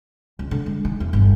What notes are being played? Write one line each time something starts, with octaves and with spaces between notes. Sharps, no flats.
C#2
D3
G#3
D#3
E2
G1